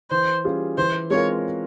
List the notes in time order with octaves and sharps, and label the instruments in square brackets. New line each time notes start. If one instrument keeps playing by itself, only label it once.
[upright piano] E3 [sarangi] C5
[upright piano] G3 C#4 F4 G#4
[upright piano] E3 [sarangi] C5
[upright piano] G#3 C4 F4 A#4 [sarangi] C#5